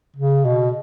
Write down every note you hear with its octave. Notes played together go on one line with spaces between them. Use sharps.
C#3
B2